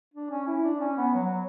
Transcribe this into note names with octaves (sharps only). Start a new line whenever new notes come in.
D4
C#4
E4
D4
C#4
B3
F#3
F#3